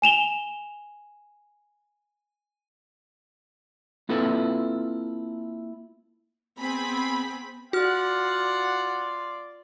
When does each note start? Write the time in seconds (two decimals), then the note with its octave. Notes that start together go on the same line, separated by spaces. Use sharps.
0.02 G#5 E7 F7 G7
4.09 A#3 C4 E4 F4 A4 B4
6.59 B3 C4 G#4 B5
7.73 F4 F#4 D5 F#5 F6